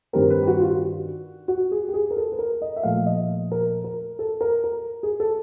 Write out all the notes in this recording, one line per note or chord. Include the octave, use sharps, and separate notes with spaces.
G2 D#3 G3 C4 A#4
B4
G4
F#4
F4
F#4
F#4
G#4
G4
G#4
A#4
A4
B4
A#4
D#5
E5
A#2 F3 A3 F5
D#5
A#4
A#4
A4
A#4
A#4
G#4
A4